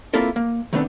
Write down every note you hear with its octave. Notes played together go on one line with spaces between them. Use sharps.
A#3 C4 E4 F4 A4 A#4
A#3
D#3 A3 B3 C4 D4